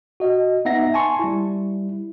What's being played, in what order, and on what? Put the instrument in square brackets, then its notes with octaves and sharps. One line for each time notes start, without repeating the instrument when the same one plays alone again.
[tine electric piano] F#4 D#5
B3 D#4 E5 F#5 A#6
G#5 A5 C6 C#6
G3 E4